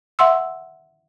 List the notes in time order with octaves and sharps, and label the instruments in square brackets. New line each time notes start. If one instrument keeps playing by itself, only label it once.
[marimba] E5 F#5 C6 E6